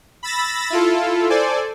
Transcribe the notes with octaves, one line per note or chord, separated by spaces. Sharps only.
B5 E6 A6 A#6
E4 F4 A4
A4 C5 D5 G#5